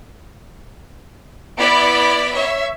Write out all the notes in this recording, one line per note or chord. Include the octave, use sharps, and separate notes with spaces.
B3 E4 D5 B6 D7
C#5 E5